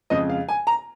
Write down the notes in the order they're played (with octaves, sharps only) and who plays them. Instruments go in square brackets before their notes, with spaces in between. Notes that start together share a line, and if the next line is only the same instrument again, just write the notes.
[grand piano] F2 C#3 G#3 D#5
F5
G#5
A#5